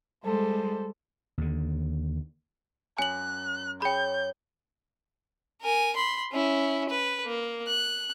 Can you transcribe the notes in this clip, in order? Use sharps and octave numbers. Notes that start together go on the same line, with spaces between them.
G3 G#3 A4 C5
D#2 D3
F#2 G#5 F#6 F#7
G#4 C#5 G5 B5 G6
A#4 G#5
B5 C6
C#4 E4
B4
A#3
F#6